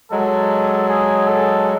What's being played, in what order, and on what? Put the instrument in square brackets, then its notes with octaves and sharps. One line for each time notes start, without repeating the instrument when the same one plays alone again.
[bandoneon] F#3 G#3 [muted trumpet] A4
[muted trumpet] G#4
A4